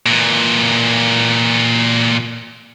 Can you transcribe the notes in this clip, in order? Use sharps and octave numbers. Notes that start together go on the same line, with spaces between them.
A#2 E3